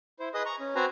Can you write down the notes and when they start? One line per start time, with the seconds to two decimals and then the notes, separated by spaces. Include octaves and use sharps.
0.20 E4 C5
0.34 G#4 B4 D#5 D#6
0.46 A#5 C#6
0.60 C#4
0.75 C4 F#4 B4 C5 G#5 A#5